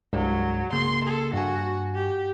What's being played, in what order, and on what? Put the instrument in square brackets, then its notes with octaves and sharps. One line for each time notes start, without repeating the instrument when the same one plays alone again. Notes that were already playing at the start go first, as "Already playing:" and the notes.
[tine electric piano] C2 G2 G#3 [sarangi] F#3
[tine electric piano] C#3 A#3 G#4 [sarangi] C6
[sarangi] A4
[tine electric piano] G2 G#5 [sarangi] F#4
[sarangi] G4